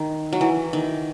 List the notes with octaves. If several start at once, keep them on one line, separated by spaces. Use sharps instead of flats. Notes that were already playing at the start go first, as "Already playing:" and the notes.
Already playing: D#3
F#3
E3
D#3